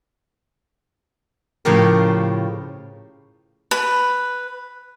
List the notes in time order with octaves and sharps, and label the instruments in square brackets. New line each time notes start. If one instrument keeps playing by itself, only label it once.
[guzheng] A2 C#3 F3 G4 A#4
[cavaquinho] B4